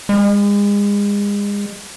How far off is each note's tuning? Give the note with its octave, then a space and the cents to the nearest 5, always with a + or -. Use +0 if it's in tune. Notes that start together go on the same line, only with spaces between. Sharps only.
G#3 -35